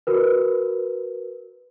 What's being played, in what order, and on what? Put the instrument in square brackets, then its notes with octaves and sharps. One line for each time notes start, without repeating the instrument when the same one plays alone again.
[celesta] F#4 A#4 B4